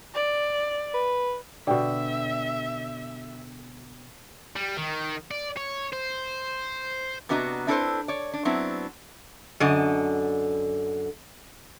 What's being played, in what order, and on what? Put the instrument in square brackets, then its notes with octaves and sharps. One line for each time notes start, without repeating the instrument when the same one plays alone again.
[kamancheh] D5
[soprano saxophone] B4
[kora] B2 D3 [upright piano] D5 G5 [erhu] E5
[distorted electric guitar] G3
D#3
D5
C#5
C5
[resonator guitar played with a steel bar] C3 B3 D4 F#4 D#5 A#5
C4 D4 E4 A4 B4 C5
C#5 D5
D4
F#3 B3 C4 D4 E4
F#2 D3 D#5